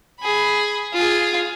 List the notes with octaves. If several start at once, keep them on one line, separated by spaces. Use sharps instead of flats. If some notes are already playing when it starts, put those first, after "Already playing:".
G#4 B5
F4 G#4